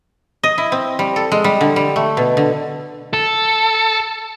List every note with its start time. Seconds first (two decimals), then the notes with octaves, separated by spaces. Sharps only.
0.44 D#5
0.58 E4
0.72 C4
0.99 G3
1.16 A4
1.32 G#3
1.44 G3
1.61 D3
1.76 G3
1.96 A3
2.17 B2
2.37 D3
3.13 A4